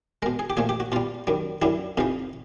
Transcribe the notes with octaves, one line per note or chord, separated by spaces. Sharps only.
B2 G#3 A#4
G#4
G4
A#2 F3 A3 G#4
G4
F#4
B2 G3 F4
F#2 D#3 G3
F#2 D3 G3 E4
F2 C3 E3 D#4